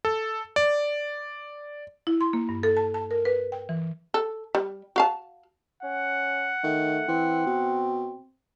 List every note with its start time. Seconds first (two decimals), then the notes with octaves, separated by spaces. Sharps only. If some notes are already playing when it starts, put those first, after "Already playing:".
0.05 A4
0.56 D5
2.07 E4
2.21 C6
2.33 A#3
2.49 G2
2.63 A4
2.77 A5
2.94 A5
3.11 A#4
3.25 B4
3.52 G5
3.69 E3
4.14 A4
4.55 G3
4.96 F#4 F5 A5
5.83 C#4 F#5
6.64 D#3 A3
7.08 E3 C4
7.47 B2